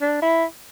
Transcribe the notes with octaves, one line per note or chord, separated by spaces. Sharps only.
D4
E4